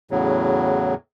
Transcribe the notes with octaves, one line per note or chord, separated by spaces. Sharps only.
E2 A2 C#3 F#3